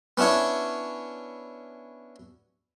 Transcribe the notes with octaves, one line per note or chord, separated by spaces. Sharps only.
B3 C#4 D4 E4 C#5